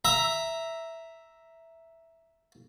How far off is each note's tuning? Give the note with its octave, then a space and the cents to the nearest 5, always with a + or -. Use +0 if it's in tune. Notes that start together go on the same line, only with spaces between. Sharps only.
E5 +0 A#5 +0